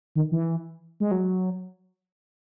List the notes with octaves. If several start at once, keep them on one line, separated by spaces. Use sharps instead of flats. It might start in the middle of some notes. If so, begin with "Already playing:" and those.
D#3
E3
G#3
F#3